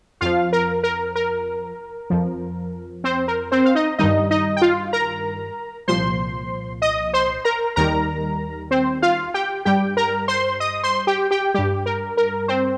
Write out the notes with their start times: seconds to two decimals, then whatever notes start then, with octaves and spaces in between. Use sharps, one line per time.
0.21 F2 F3 F4 F5
0.53 A#4
0.84 A#4
1.16 A#4
2.10 F2 F3
3.04 C4 C5
3.28 A#4
3.52 C4 C5
3.65 F5
3.75 D#4 D#5
3.98 G2 D#3 G3 D#4 D#5
4.31 D#4 D#5
4.57 G5
4.62 F4 F5
4.93 A#4 A#5
5.88 C2 A#2 F3 C5 C6
6.82 D#5 D#6
7.13 C5 C6
7.45 A#4 A#5
7.76 D#2 D#3 G3 A#4 A#5
8.71 C4 C5
9.02 F4 F5
9.34 G4 G5
9.65 G2 G3 G4 G5
9.97 A#4 A#5
10.28 C5 C6
10.60 D#5 D#6
10.83 C5 C6
11.07 G4 G5
11.31 G4 G5
11.54 G2 G3 G4
11.86 A#4
12.17 A#4
12.48 C4 C5